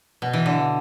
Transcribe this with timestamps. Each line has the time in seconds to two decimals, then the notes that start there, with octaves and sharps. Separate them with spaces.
0.22 B2
0.33 E3
0.46 D3